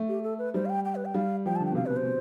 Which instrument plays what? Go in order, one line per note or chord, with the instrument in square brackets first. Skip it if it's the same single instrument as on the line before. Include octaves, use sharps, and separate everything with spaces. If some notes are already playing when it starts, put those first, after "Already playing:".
Already playing: [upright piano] A3
[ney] G4
A4
B4
[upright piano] G3 [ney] C5
[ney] F5
G5
G5
B4
G5
[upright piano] G3 [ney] F5
[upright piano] F3 [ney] G5
[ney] A5
[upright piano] D3
[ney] G5
[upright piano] B2
[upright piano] C3 [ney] F5
[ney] B4
[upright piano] B2
[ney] C5
[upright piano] B2